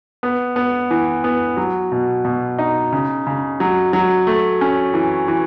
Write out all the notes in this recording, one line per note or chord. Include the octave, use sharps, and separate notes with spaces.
B3
B3
E3
B3
F#3
B2
B2
D#4
C#3
C#3
F#3
F#3
A3
C#4
E3
E3